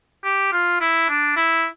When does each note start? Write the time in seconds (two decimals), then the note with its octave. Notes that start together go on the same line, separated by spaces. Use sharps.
0.24 G4
0.52 F4
0.81 E4
1.09 D4
1.36 E4